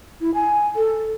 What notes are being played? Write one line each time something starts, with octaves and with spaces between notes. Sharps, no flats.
E4
G#5
A4